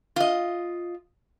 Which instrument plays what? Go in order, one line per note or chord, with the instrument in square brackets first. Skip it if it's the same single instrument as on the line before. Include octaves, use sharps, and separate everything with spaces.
[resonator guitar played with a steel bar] F4 D#5